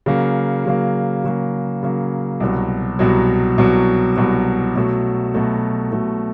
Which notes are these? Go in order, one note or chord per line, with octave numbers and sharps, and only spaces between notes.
C#3 F#3 A#3
C#3 F#3 A#3
C#3 F#3 A#3
C#3 F#3 A#3
C2 B2 F#3
C2 B2 F#3
C2 B2 F#3
C2 B2 F#3
B2 F#3 A3
B2 F#3 A3
B2 F#3 A3